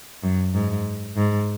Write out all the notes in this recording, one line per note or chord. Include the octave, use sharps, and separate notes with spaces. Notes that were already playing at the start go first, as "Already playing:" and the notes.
F#2
G#2
G#2